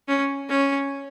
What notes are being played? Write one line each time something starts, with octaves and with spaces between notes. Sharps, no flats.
C#4
C#4